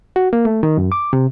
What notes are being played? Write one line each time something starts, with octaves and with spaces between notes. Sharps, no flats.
F#4
A#3
A3
D#3
F#2
D6
C3